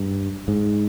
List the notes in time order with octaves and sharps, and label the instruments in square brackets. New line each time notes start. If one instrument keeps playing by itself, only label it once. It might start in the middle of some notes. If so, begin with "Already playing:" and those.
Already playing: [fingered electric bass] G2
G#2